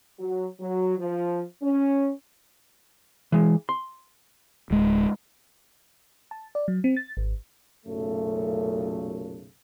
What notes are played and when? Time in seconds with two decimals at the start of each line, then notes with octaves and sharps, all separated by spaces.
0.18 F#3
0.60 F#3
0.98 F3
1.62 C#4
3.32 E3 G#3
3.69 C6
4.71 D1 G#3
6.31 A5
6.55 D5
6.68 F#3
6.84 C4
6.97 A6
7.17 G#1
7.86 B1 F#2 A#2 C#3 A3